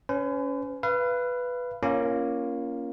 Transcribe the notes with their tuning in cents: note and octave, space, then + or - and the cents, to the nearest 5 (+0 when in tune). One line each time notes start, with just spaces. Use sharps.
C#4 +15 B4 +45
B4 +0 F5 -35
A#3 +10 C#4 +0 F4 -35